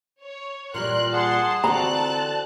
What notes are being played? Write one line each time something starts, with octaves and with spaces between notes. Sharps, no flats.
C#5
A#2 E3 G3 A#4 C6 F#6
G#4 F#5 A5 C6
D3 E3 C4 F#4 A5 A#5 F#6